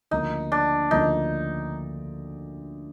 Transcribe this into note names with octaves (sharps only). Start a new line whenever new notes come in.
D2 C#3 F3 A#3 D#4
D4
D2 C#3 F3 A#3 D#4